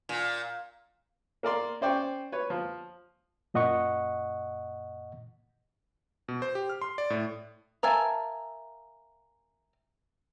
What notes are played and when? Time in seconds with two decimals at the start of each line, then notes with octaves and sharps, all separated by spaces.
0.09 A#2
1.43 A#3 A#4 D5 C6
1.81 C#4 C5 D5 G5 C#6
2.32 B4 C#5
2.50 F3
3.54 F#2 A#2 D#5 F#5 C#6
6.28 B2
6.42 C5
6.55 G4
6.69 F6
6.82 C6
6.98 D5
7.10 A2
7.83 A#4 E5 F5 G#5 A5